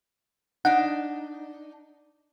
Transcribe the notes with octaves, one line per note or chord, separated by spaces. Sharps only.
D4 D#4 F#5